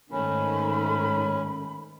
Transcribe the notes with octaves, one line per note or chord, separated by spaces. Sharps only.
G#2 D#3 A3 C#4 B5